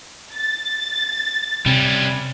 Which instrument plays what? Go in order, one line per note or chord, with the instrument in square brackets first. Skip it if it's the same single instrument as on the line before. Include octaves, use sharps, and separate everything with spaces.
[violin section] A6
[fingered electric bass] C3 [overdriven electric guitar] G3 C#4